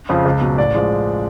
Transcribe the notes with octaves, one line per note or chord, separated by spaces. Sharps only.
F2 C#3 F3
C#2
B2 F#3
A1 D5
F3 G#3